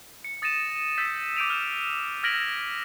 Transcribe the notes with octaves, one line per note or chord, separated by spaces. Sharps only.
C#7
D#6 A6 A#6 C#7 D#7 E7
E6 G6 A6 B6
D6 G6 B6 D7 D#7 F7
F6 E7
F6 G#6 A#6 B6 D7 F#7